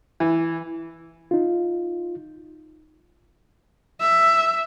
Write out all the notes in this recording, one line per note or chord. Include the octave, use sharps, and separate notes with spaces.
E3
D#4 F4
E5